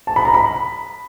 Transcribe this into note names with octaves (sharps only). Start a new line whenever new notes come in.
A5
B5
A#5
B5